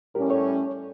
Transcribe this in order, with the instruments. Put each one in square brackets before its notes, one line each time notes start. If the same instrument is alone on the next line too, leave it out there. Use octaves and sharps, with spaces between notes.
[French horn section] A2 G3 C#4 [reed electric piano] G4 A#4
[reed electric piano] A4 C#5